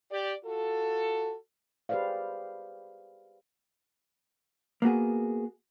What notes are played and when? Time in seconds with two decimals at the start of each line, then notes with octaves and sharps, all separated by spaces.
0.11 G4 D5
0.44 F4 F#4 A4
1.89 G4 G#4 B4 C5 D5 F5
4.82 A#3 B3 F#4 G#4